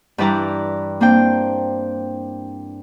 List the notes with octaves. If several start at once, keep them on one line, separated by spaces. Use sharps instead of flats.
G2 E3 E4 D5 G5 A#5
A#3 C4 D4 C5 G5